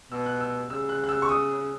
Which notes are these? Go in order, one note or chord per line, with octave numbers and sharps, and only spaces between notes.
B2 E6
F#6
E6
C#3 E6
F#6
F#6
E6
C#6
D#6